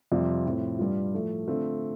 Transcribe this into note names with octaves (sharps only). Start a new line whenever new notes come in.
F2 C3 G3 C4 F4
A2 F3 C4
G2 G3 F4
A2 F3 A3
D3 A3 C4 F4